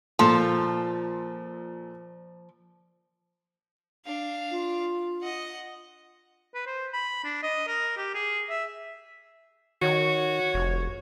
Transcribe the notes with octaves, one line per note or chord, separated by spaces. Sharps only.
A#2 F3 A4
D4 F5
F4
D#5 F#5
B4
C5
B5
D4
D#5
A#4
G4
G#4
E5
D#3 F#4 C#5
F1